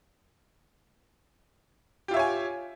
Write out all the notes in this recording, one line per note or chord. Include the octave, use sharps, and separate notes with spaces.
F4 G4 C#5 E5 G#5